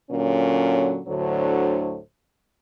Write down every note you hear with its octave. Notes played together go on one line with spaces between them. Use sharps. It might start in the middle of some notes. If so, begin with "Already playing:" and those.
A#2 D3 F#3 C#4
D2 A2 D3 F#3 C5